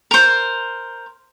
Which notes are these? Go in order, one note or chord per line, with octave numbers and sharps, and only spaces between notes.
A#4 C5